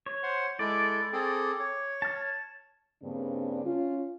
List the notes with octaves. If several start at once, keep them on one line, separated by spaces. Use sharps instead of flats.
C#5
C5 F#5 C6
G#3 E4 A4 D5
C4 G#4 A4
C#5
A5 F6
G2 C#3 A#3 C4 D4
C#4 F4